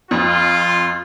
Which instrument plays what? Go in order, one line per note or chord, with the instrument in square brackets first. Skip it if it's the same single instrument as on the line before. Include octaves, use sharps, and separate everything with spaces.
[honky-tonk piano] F2 [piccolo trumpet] F4